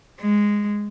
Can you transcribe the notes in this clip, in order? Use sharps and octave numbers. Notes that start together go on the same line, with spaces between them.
G#3